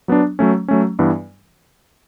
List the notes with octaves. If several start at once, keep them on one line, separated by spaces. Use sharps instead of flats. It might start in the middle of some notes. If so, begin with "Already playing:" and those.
F#3 B3 D4
F#3 A3 C#4
F#3 A3 C#4
G2 E3 B3